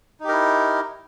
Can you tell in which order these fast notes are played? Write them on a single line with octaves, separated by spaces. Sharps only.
D#4 G4 A#4 E4